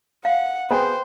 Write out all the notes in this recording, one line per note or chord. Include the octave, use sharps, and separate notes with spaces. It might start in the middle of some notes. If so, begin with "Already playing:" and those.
F5 F#5
B3 G#4 C5 G5